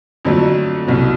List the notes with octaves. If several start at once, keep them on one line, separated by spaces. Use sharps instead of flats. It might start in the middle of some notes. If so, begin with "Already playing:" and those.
F2 D3 F#3 A3
C2 B2 F#3